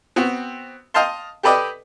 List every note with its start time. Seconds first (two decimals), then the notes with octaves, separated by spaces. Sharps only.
0.16 B3 C4 F#4
0.94 D#5 F5 G5 A5 C6
1.43 G4 A4 B4 D5 D#5 G5